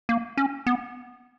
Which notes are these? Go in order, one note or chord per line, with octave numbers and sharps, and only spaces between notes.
A#3
C#4
B3